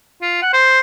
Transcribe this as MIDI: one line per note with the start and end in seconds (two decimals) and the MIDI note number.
0.22 0.40 65
0.42 0.53 78
0.53 0.80 72